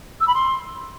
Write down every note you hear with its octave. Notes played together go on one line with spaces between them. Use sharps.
E6
B5
C6